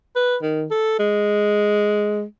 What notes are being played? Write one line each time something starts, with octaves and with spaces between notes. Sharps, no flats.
B4
D#3
A4
G#3